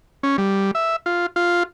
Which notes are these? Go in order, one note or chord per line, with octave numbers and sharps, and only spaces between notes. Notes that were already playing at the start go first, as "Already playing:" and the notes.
C#4
G3
E5
F4
F4